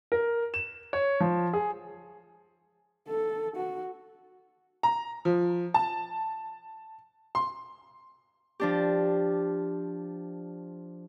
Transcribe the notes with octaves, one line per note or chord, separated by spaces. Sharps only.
A#4
E7
C#5
F3
G#4
A4
F#4
A#5
F3
A5
C6
F3 D4 G4